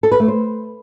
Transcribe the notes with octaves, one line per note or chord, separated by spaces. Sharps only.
A4
B4
A3
C5